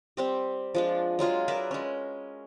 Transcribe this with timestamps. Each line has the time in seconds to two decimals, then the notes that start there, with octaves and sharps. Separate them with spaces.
0.17 G3 C4 G4
0.75 F3 G#3 D4
1.19 F#3 G#3 F4 G#4
1.48 A#4 B4 D5 E5
1.71 G#3 C#4